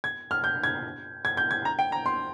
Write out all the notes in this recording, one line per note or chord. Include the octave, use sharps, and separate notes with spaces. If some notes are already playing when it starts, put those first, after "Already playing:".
G#6
F6
G6
G#6
G#6
G6
G#6
A#5
G5
A#5
C6